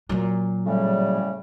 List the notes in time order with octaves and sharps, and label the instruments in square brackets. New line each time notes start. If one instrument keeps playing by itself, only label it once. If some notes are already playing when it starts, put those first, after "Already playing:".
[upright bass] A#2 F#3
[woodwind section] A2 C#3 G3